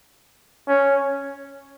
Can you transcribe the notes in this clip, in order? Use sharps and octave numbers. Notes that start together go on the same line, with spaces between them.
C#4